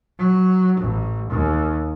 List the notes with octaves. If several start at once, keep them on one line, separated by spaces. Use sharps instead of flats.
F#3
A1
D#2